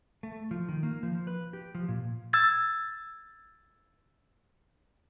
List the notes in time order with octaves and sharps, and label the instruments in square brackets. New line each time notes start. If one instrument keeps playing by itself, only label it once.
[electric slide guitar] A3
F3
D#3
A#3
F3
B4
G4
F3
A#2
[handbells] E6 G#6 A6